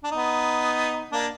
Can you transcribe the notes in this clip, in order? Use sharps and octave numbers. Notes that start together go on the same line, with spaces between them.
D4
B3 D#4
A#3 D4